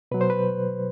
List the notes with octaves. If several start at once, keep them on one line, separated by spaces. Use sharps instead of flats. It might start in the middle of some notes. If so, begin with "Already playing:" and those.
B2 F#3 B4
C5
B4